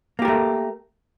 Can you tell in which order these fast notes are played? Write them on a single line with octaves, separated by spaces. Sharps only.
A#3 G4 A#4 A3